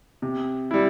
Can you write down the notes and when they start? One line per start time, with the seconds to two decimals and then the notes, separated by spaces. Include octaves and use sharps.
0.22 C3
0.71 G3 E4